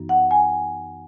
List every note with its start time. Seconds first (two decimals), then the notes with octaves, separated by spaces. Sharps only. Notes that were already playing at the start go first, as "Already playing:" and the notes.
Already playing: F#2 E3 B3 D#4
0.09 F#5
0.31 G#5